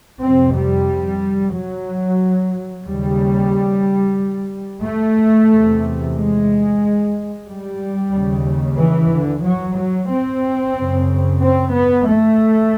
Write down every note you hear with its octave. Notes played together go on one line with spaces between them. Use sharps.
F2 C3 C4
G3
F#3
D#2 C#3 G3
A3
E2 C3
G#3
G3
D#2 C#3
E3
D3
F#3
F#3
C4
F#2 C#3
C4
B3
A3